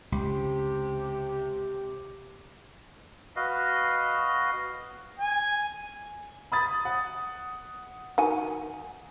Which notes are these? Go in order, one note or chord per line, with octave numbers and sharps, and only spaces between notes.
C#2 C3 G4
F#4 B4 D#5 F5
G#5
B5 D#6 A6
F#5
D#3 F#4 G#5